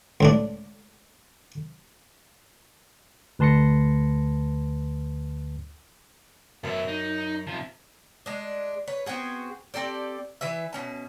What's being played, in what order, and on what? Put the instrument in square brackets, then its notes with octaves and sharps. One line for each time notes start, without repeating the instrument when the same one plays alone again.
[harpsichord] C#2 A2 D4
[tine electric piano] D2 B4 A5 C6 A#6 C#7
[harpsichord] F#2 [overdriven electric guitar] B2 E5
[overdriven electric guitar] D#4
C3 F3
[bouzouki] G#3 D4
B4 C#5
B3 C4 F#4 G#4
C4 G4 A4 D5
E3 B4 E5
B2 C#4 A5